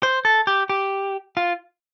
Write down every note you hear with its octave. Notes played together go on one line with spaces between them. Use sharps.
C5
A4
G4
G4
F4